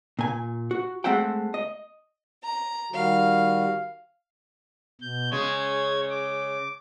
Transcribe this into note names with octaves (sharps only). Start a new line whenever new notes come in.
A#2 G#5
F#4
G#3 A3 C4 E5 F#5 G5
D#5
A#5
D#3 G3 F#4 F5
B2 G6
C#3 G#3 C#5 G#6
D6